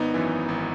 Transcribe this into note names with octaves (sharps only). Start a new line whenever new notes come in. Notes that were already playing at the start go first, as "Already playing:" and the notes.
Already playing: G#1 B3 D#4
F#2 E3
G#1